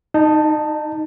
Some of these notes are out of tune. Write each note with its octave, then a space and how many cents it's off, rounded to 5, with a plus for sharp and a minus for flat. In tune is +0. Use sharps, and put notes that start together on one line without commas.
D#4 -5 D#5 -40 A5 +10